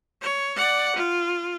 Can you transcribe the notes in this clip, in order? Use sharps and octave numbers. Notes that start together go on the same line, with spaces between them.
C#5
D5 F#5
F4